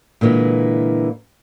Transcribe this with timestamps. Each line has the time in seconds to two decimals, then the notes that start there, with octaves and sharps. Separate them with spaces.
0.21 A#2 D3 E3 G#3